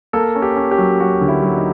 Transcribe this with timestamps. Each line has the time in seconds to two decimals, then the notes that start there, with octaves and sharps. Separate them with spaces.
0.13 A#3 A4
0.35 C#4
0.42 G4
0.56 C#4
0.71 G4
0.78 F#3
1.00 F#3 F#4
1.21 D3
1.28 E4
1.42 F#3
1.57 D#4